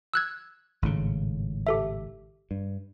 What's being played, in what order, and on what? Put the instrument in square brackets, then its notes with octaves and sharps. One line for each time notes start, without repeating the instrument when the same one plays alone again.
[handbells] E6 F#6 G#6
[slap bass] G#1 A2 C#3
[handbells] G4 A4 E5
[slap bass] G2